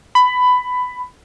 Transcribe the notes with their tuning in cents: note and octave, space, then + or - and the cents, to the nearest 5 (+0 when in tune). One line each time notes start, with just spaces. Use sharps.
B5 +15